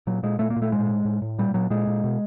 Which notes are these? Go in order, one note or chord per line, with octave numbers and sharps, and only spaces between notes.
A#2 F#3
A#2 G#3
A#2 A3
A#3
A#2
A3
A2 G#3
A2
A2
A2
A#2 G3
A#2 F#3
A#2 G#3
A#2
B2